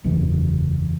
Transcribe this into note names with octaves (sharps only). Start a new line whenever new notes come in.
F#1 E2 C#3 E3